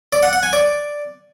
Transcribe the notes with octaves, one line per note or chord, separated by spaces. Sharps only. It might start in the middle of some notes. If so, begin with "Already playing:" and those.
D5
F#5
F#5
G#5
D5